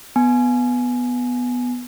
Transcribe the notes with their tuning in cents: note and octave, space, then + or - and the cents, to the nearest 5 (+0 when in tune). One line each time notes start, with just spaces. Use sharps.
B3 +0 G#5 +20